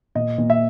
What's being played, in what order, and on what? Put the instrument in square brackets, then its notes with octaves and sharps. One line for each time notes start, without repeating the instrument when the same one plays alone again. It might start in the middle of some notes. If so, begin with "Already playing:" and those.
[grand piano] A#2 D#5
A#2
E5